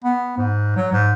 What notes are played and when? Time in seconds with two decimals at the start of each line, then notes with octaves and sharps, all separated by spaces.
0.04 B3
0.38 G#2
0.76 F#3
0.93 G#2